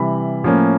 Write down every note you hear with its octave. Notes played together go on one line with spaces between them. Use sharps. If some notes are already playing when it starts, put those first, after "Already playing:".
Already playing: C3 E3 G3 B5
A2 F3 A#3 C#4